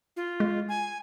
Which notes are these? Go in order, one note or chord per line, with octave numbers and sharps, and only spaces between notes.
F4
G#3
G#5